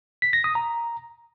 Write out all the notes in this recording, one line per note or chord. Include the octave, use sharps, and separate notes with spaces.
B6
A#6
D#6
A#5